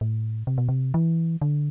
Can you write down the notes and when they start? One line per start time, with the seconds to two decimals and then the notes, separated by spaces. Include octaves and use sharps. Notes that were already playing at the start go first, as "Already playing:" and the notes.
0.01 A2
0.47 C3
0.58 B2
0.69 C3
0.94 E3
1.41 D3